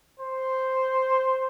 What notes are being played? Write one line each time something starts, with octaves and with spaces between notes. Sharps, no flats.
C5